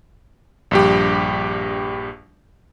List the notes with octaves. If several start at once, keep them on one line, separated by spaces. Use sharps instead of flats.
A#1 G2 G4